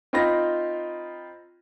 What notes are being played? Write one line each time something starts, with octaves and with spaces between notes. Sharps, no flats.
C4 D#4 F4 B5 A#6